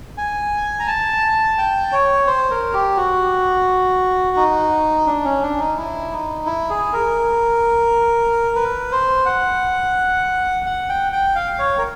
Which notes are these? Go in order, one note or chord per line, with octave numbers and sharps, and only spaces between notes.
G#5
A#5
A5
G5
C#5
C5
A#4
G4
F#4
D#4
D4
C#4
D4
D#4
E4
D#4
E4
G#4
A#4
B4
C5
F#5
F#5
G5
G5
F5
C#5
A#4